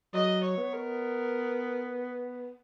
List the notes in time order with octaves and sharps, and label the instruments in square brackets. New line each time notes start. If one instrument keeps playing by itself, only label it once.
[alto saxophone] F#3 [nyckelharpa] D#5
[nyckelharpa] C#5
[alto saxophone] B3
[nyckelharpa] A#4